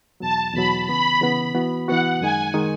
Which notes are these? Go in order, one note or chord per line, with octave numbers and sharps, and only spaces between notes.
E2 B2 F#3 A5
E2 B2 F#3 B5
C#3 E3 B3 B5
C#3 E3 B3
E3 B3 F#4
E3 B3 F#4 F#5
F#2 D#3 G#3 D#4 G#5
D#3 G#3 D#4